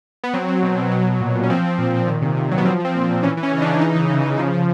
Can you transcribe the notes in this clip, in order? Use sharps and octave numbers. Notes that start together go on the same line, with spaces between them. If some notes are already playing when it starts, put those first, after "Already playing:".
B3
F#3 C4
F#3
B2
B2
F#3
F#3
A#2
A#2
C#4
F3 C4
F3
A#2
A#2
D#3
C3
C3
F#3
B3
F3 C4
F3 C4
A#2
C4
A#2
E3 C#4
E3
C#4
C#3
D#4
D4
C#3
E3 D#4
E3
C#3
C#3
F3
F3